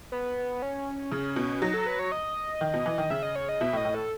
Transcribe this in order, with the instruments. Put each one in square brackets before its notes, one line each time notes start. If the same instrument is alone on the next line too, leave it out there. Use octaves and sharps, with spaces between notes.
[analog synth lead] B3
C#4
[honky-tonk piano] C#3
B2
[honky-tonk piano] F#3 [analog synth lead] D#4
[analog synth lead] A4
B4
C#5
D#5
[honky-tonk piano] D#3
B2
E3
D#3
[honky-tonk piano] C#3 [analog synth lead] E5
[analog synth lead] D#5
C#5
D#5
[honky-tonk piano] B2 [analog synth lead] E5
[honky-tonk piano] A2
[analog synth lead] D#5
[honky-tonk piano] A2
[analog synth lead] A4